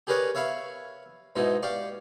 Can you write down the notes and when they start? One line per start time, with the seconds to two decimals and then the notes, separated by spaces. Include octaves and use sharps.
0.07 G4 G#4 A#4 B4 C#5 D5
0.35 C#5 E5 F5 B5 C#6
1.36 G#2 B2 D#4 E4
1.63 G4 D5 F5 C#6